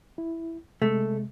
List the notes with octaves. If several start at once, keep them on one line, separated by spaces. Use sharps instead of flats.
E4
C3 G#3 A3